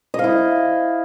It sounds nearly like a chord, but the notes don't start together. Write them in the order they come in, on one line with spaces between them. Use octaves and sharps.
D#5 F5 E4